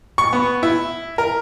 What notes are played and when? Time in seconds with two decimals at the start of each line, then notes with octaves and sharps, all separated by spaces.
0.18 C#6
0.33 B3
0.63 E4
1.18 A#4